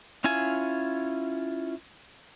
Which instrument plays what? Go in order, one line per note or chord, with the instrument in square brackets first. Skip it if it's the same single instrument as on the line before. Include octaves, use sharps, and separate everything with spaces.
[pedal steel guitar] C#4 E4 F4 G#5